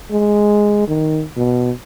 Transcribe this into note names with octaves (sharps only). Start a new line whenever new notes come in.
G#3
D#3
B2